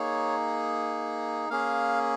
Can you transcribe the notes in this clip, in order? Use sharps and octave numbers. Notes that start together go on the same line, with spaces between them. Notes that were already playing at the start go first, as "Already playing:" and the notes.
Already playing: A#3 D#4 G#4 C#5
A#3 C#4 G#4 F5